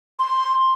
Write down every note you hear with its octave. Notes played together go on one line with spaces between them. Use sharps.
C6